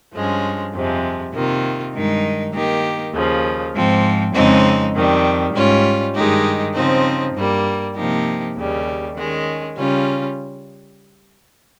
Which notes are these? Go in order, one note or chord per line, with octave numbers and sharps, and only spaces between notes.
G2 F3 G#3 C#4
F2 C3 F3 G#3
C3 D#3 A#3 F4
G2 D#3 G#3 D#4
D#3 A#3 D#4 G4
D#2 C#3 F3
G#2 F3 C4
F2 C#3 G#3 C4 D#4
F2 D#3 G3
G#2 G3 C#4 F4
G2 D#3 G#3 D#4 G4
C#3 F3 C4 D#4
G2 G3 A#3
C3 F3 A#3 D#4 G4
D#2 C#3 G3
D#3 G#3 C#4
C#3 G3 C#4 F4